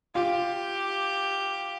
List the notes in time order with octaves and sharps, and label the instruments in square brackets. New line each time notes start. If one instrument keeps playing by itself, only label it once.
[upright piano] F4 [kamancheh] G4